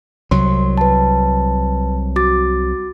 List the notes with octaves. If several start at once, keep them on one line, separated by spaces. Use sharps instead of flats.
C2 F#3 C6
B4 A5
F#4 D6 A6